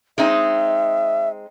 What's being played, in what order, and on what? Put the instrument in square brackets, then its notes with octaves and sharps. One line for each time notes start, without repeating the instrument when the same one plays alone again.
[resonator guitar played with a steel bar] G#3 C4 D#4 [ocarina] E5